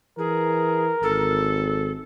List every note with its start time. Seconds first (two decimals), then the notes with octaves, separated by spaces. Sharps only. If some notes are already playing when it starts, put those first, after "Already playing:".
0.18 E3 G#4 A#4
1.03 G#1 A4